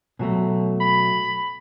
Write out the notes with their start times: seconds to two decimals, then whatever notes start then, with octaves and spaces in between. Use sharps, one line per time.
0.19 B2 F#3 A3
0.81 B5